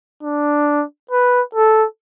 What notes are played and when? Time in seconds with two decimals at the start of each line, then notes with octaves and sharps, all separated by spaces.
0.23 D4
1.11 B4
1.55 A4